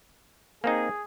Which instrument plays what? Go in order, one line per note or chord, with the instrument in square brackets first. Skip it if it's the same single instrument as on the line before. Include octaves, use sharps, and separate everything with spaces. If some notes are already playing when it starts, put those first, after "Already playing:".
[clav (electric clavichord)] A#3 C4 D#4 [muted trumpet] G#4